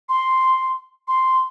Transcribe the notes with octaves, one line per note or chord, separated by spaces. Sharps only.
C6
C6